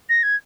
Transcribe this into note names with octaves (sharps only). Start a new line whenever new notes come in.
A#6
G#6